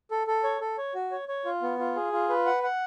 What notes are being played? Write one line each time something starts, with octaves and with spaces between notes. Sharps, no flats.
A4
A4
C#5
A4
C#5
F#4
C#5
C#5
F4
B3
F4
G#4
F4
B4
F#5
F#5